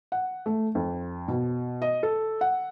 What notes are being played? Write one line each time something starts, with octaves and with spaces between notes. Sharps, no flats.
F#5
A3
F2
B2
D#5
A4
F#5